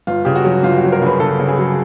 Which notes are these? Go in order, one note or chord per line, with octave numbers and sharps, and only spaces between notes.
G1 F4
C#3 G4
F#4
F#3
G1 F4
F#4
F#3
A#4
C#3 B4
C#3 A4
C#3
G#4
F#3